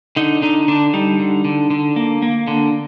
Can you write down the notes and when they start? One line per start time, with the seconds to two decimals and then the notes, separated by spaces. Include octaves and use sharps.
0.16 D3 D#4
0.42 D3 D#4
0.68 D3 D4
0.94 G3 D#4
1.20 D3
1.45 D3
1.71 D3
1.96 A#3
2.22 A#3
2.48 D3